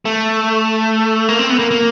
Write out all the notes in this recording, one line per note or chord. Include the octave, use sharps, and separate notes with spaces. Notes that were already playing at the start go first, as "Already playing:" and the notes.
A3
A#3
C4
B3
A#3
A#3